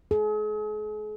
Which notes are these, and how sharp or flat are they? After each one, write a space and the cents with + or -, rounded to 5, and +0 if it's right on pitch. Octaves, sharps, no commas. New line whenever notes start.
G#4 +40